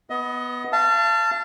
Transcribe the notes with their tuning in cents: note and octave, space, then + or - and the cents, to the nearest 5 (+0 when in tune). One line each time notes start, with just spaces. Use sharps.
B3 +0 D#5 +25
F5 -35 A5 +10